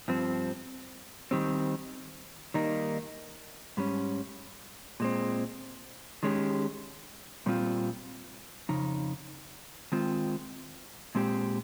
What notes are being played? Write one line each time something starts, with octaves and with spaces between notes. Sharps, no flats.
G2 F3 C4
D#3 G3 C4
D#3 G3 A#3 D#4
G#2 G3 C#4
A#2 G#3 C4
D#3 G#3 C#4 G4
A#2 G3 C4 F4
F2 C#3 D#4
D#3 G#3 C4 F4
A#2 G#3 C4 G4